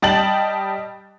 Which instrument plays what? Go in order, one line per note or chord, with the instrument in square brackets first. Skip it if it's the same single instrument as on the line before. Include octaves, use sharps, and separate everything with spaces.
[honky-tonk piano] G3 D#5 G5 A5 A6 F#7